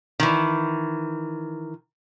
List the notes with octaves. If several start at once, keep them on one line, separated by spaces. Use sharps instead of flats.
D#3 E3